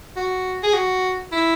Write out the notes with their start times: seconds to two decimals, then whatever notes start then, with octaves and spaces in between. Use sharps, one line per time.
0.17 F#4
0.63 G#4
0.73 F#4
1.32 E4